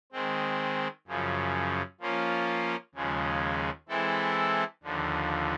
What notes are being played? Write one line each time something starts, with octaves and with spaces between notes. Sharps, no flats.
D#3 G#3 C4
F#2 C#3 F3
F3 A#3 C#4 F4
D#2 C#3 F3 G#3
E3 G#3 C4 E4 A4
D#2 D3 F3